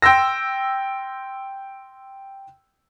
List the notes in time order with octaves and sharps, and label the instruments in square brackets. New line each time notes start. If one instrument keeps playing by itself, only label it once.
[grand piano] G5 C6 E6 A#6